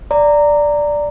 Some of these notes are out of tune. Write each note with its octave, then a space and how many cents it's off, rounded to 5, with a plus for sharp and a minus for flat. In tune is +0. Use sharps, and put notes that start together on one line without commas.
D5 +0 A#5 -15